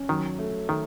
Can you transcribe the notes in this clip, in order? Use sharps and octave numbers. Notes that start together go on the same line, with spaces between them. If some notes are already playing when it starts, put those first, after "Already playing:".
Already playing: C#4
D#3 F#3
A3
D#3 A3